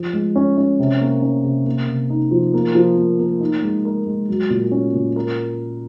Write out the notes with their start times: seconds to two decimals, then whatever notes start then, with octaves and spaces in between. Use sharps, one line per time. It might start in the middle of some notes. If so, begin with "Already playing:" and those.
Already playing: F3
0.13 G#3
0.36 C#4
0.58 C#4
0.79 C3
1.01 A#3
1.22 C#4
1.44 C3
1.66 A#3
1.88 C3
2.10 D#4
2.31 F3
2.54 A#3
2.75 F3
2.97 A#3
3.19 A#3
3.40 D#4
3.62 G#3
3.85 A#4
4.06 G#3
4.28 F#3
4.50 A#2
4.72 C#4
4.93 A#2
5.16 A#4